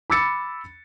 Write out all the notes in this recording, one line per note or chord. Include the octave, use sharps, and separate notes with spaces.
B5 D6 E6 A6 C#7